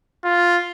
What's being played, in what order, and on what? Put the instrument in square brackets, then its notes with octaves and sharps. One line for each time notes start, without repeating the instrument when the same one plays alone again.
[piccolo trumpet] F4